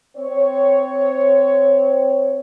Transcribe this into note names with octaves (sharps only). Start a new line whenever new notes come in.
C4 C#5